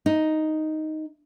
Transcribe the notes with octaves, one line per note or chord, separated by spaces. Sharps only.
D#4